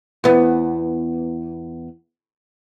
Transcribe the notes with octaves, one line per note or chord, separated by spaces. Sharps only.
E2 B3